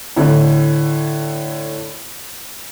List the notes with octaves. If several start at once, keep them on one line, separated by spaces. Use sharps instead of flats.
A2 D3